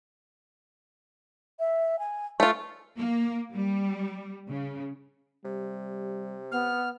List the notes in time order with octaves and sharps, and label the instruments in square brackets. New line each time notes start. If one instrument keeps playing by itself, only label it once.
[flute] E5
G#5
[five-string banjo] A3 F4 [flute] C#6
[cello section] A#3
G3
C#3
[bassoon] C3 [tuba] G3
[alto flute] B3 [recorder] F6